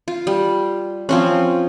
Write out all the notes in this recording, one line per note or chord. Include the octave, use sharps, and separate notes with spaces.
F4
G3
F3 C4 C#4